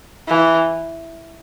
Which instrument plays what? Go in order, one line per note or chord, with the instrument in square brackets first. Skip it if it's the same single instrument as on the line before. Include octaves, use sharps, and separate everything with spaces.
[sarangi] E3